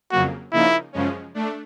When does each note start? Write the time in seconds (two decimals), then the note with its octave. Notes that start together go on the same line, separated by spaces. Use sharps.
0.11 F2 C#3 F#3 A#3 F#4
0.52 C#3 F3 A#3 D#4 E4
0.93 F#2 C#3 F3 G#3 C#4
1.34 A3 D4